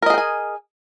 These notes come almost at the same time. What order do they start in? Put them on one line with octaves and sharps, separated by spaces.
A#4 D#5 G#4 G5 G#5